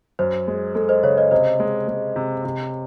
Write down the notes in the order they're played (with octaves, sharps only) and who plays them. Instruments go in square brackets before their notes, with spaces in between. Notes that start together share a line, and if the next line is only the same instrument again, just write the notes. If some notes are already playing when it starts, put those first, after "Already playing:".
[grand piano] F#2 [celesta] C5
[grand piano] G#3
[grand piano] G#3 [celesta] A4
[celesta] C5 D#5
[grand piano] C#3 [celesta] C#5
[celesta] C5 D#5
[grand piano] C3 [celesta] C5 D#5
[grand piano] G#3
G#3
C3
C3